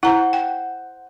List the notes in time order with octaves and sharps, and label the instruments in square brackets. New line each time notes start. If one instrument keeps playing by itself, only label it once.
[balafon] E4 A#5 [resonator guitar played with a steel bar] C5 F#5
[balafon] G5